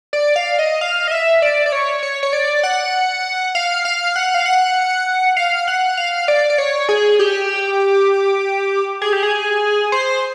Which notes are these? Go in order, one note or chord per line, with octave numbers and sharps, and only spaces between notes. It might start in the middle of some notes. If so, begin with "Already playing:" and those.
D5
F5
D#5
F5
D#5
E5
D5
D5
C#5
C#5
C#5
D5
F#5
F5
F5
F#5
F5
F#5
F5
F#5
F5
D5
D5
C#5
G#4
G4
G#4
G4
G#4
C5